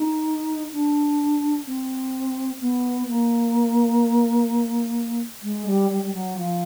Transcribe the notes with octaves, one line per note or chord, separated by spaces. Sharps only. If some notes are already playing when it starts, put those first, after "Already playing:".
Already playing: D#4
D4
C4
B3
A#3
G#3
G3
G3
G3
F#3
F3